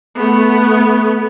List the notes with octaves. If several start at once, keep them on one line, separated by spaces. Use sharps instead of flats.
A3 B3